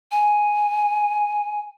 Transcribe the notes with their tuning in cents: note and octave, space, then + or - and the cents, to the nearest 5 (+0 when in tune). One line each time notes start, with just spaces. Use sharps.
G#5 +0